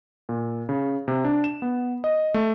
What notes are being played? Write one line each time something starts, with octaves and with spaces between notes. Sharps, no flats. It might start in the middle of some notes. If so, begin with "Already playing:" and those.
A#2
C#3
C3
D4
E7
B3
D#5
A3